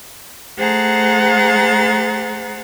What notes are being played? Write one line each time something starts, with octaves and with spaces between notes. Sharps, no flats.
A3 G#4 C5 F#5 A#5 A6